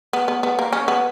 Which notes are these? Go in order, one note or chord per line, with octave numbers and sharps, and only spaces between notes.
B3
B3
B3
A#3
C#4
B3